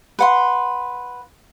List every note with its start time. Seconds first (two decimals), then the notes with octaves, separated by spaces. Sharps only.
0.19 B4 F#5 C6